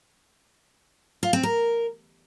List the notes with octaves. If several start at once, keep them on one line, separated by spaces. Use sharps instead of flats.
F4
C4
A#4